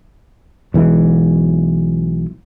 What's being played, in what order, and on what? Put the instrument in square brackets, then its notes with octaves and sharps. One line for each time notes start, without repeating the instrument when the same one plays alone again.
[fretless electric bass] B1 E3 G#3